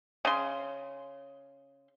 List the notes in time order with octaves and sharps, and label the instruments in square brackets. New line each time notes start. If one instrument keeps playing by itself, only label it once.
[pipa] C#3 C6